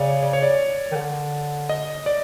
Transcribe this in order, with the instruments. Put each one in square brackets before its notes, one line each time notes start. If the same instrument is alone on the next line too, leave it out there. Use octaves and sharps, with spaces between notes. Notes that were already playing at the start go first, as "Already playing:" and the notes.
Already playing: [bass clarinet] C#3 [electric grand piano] C#5 D5
[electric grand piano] D5
C#5
D5
[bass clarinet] D#3
D3
[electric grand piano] D#5
D5